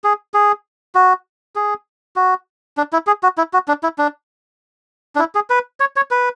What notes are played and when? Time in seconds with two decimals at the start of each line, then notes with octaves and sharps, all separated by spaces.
0.04 G#4
0.34 G#4
0.95 F#4
1.56 G#4
2.16 F#4
2.77 D4
2.93 E4
3.07 G#4
3.23 F#4
3.38 E4
3.53 F#4
3.68 D4
3.83 E4
3.98 D4
5.16 D4
5.19 E4
5.35 G#4
5.50 B4
5.80 C#5
5.96 C#5
6.11 B4